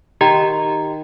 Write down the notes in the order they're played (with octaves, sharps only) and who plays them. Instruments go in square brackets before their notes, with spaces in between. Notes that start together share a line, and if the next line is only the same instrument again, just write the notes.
[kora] D#3 [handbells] G4 D#5 A#5